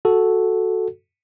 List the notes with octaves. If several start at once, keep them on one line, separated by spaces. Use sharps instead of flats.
F#4 A4